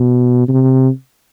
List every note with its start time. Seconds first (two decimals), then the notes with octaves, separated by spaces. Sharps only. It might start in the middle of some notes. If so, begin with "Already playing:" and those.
Already playing: B2
0.48 C3